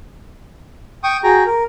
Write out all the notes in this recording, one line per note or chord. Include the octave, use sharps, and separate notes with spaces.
G5 C#6 D#6
F#4 G#4 G5 A#5
A#4